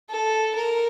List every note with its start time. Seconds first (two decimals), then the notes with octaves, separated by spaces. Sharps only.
0.10 A4
0.55 A#4